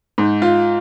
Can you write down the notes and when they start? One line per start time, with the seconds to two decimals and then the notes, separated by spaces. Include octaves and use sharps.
0.18 G#2
0.42 F4